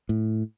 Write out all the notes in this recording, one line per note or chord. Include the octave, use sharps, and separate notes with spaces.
A2